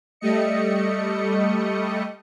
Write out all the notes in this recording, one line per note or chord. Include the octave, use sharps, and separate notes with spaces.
G3 A3 D#5 C#7